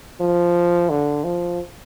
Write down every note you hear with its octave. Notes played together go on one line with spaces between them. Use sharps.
F3
D3
F3